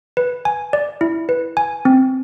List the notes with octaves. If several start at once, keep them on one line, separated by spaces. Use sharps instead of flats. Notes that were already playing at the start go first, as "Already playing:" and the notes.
B4
G#5
D5
E4
B4
G#5
C4